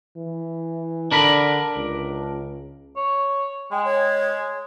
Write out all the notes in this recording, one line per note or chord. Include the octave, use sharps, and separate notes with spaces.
E3
D3 D4 A#4 B5
C#2
C#5
G#3 G5
C#5